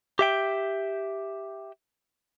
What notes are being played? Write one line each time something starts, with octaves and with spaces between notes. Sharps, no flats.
G4 E5 G5